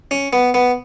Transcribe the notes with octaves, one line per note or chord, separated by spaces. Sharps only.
C#4
B3
B3